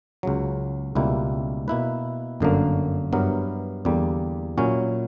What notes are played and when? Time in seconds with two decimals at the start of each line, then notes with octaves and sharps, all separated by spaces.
0.23 C#2 C#3 F#3
0.95 C#2 B2 G3 A#3 E4
1.68 B2 A#3 E4 B4
2.40 G1 F#2 D3 A#3
3.12 G2 F#3 B3 E4 A#4
3.85 E2 D3 G3 A#3
4.57 A#2 F#3 C#4 E4